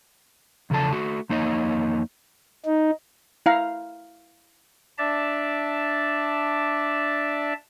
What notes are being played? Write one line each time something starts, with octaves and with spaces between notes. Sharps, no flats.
E2 C#3 F3 A4 A5
A3 F#4
F2 A#3 D#4 C#5 D#5
D#4
E4 F5 A#5
D4 D5 E5 A5